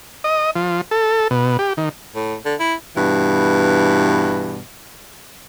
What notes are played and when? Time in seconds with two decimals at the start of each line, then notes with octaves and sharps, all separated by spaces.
0.24 D#5
0.55 F3
0.91 A4
1.31 B2
1.59 G4
1.77 D#3
2.15 A2
2.45 D3
2.60 E4
2.96 G2 B2 E3